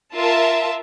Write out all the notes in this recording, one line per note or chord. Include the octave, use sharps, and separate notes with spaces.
F4 A#4 E5 A5